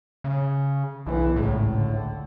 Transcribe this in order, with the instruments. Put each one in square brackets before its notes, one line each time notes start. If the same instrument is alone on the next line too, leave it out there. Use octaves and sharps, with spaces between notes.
[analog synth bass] C#3
[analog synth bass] B1 [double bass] E3
[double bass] G#1 C#2 [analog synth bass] A2
[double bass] D3